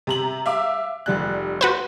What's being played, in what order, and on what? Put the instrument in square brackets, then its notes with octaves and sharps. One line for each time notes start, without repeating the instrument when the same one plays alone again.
[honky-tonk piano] C3 A#5 F#7
E5 F5 D6
F1 G3 F#6
[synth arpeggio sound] F#4 B4 C5